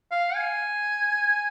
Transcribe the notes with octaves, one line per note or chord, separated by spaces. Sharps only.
F5
G#5